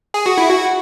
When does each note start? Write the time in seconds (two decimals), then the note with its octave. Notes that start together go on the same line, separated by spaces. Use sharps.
0.14 G#4
0.26 F#4
0.38 E4
0.50 F#4